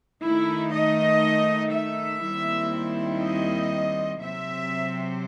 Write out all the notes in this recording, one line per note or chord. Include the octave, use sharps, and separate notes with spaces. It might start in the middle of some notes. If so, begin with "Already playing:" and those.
D#3 A3 D#4 E4
D#5
E5
D#2 D#3 G3 C4 E4
D#5
C3 F#3 C4 E5